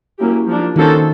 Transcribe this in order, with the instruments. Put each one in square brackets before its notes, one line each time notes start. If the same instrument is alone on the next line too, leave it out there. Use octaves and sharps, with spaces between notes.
[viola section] F#3 A#3 C#4 E4 G4
F3 A#3 D4
[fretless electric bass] D#3 [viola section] A#3 C#4 F#4 A4 C5